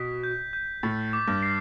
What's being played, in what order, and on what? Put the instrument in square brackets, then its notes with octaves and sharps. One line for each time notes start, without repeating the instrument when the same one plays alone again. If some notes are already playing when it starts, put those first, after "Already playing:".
Already playing: [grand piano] B2 [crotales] B6
[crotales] G6
G6
[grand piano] A2 [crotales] A6
[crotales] D6
[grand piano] G2
[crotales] C7